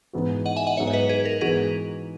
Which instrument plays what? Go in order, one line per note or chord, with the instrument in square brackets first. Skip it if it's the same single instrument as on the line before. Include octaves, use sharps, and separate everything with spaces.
[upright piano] G#2 E3 B3 F#4
[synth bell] D#5 F#5
E5 G#5
D#5 F#5
[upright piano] G#2 F#3 B3 [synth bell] C#5 E5
[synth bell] C#5
B4 D#5
G#4 B4
A#4
[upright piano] G#2 E3 B3 D#4 F#4 [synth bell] G#4 B4